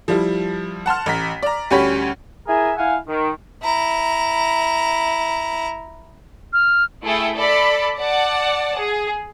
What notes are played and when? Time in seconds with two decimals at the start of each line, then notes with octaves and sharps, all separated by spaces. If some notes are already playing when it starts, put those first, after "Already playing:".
0.08 F3 G3 E4
0.86 F#5 A5 C6 F6
1.06 A1 A#5 B6
1.43 D5 A#5
1.70 D2 G3 C#4 G4 C#5 B5
2.48 E4 G#4 A#4 E5 G#5
2.78 E4 F5 F#5 G#5
3.08 D#3
3.63 E4 A#5
6.53 F6
7.03 A3 E4 G#4 A4 G5
7.36 A4 D5 B5
7.98 D5 F#5 A5
8.76 G#4